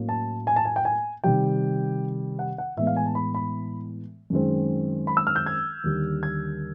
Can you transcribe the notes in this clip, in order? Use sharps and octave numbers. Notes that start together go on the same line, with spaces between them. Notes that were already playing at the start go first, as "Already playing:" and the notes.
Already playing: A2 F#3 A#3 C#4
A5
G#5
A5
G#5
G5
G#5
C3 D#3 G3 G5
F#5
F#5
A2 E3 G#3 B3 E5
F5
G#5
A5
B5
B5
F#2 D#3 G#3 C4
B5
E6
F6
G6
G#6
D#2 D3 G3
G#6